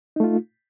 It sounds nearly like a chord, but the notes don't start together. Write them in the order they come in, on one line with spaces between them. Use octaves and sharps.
D#4 A3 F4